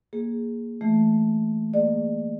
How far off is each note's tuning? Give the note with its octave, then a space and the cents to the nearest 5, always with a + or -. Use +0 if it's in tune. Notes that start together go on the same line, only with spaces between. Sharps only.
A#3 +0 G#4 +0
E3 +0 A3 -10
A#3 +0 G#4 +0 D5 +35